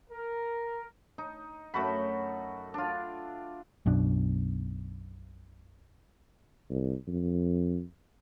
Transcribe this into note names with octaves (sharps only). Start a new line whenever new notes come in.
A#4
D#4
F#2 A3 F#4 B5
D4 F4
B1 F#2 B2 D4
C2
F2